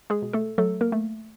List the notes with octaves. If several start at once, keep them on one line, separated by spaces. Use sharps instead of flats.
G#3 G#4
B2
A3 A4
F#3 A3 A4
A#3 A#4
A3